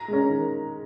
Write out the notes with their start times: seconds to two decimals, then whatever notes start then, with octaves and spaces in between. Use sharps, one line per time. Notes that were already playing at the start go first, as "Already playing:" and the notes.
Already playing: A#5
0.08 G#3 C#4
0.29 D#3